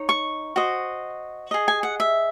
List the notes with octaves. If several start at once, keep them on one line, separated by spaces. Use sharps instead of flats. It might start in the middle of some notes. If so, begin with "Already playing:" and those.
Already playing: D#4 C#5
C#6
F#4 C5 D#5
G#4 D#5
G#5
F#5
E5